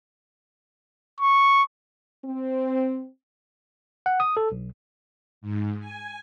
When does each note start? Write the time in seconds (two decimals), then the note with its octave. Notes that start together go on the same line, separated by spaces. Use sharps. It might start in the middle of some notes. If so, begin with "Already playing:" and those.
1.21 C#6
2.25 C4
4.06 F#5
4.20 D#6
4.37 A4
4.52 B1
5.41 G#2
5.80 G#5